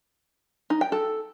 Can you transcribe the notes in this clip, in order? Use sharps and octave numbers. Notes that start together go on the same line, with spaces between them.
D#4
G5
A4